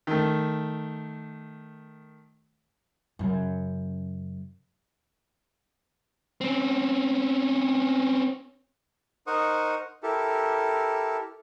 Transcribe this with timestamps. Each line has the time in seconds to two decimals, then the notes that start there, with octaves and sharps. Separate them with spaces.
0.07 D#3 A3
3.19 F#2 C#3
6.41 C4 C#4
9.27 D#4 A#4 C5 F#5 C#6 D#6
10.03 E4 G4 A4 A#4